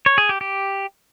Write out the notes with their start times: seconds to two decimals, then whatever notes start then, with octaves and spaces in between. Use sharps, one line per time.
0.06 C#5
0.18 G#4
0.29 G4
0.41 G4